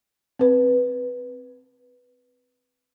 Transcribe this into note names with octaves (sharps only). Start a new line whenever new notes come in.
C4 B4